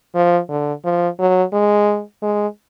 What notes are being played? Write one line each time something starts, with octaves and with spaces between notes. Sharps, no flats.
F3
D3
F3
F#3
G#3
G#3